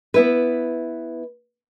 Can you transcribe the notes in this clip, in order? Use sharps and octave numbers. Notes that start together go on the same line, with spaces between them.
B3 E4 B4